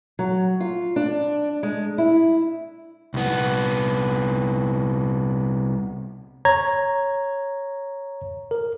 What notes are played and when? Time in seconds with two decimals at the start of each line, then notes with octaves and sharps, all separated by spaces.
0.19 F#3
0.60 F4
0.96 D4
1.63 G#3
1.98 E4
3.14 C2 B3
6.45 C#5 A#5 G#6
8.51 A#4